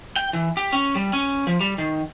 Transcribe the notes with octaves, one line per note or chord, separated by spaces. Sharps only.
G5
E3
G4
C#4
G3
C#4
F3
G3
D#3